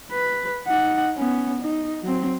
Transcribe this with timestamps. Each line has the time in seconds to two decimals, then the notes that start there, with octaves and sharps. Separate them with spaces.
0.11 B4
0.67 D#4 F#5
1.15 B3 C#4
1.61 D#4
2.03 F#3 C4